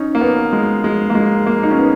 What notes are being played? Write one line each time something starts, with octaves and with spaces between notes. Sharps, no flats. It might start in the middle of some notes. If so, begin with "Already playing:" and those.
Already playing: C#4 D#4
A#3
B3
G#3
G#3
A#3
G#3
A#3
D#4
C#4
B3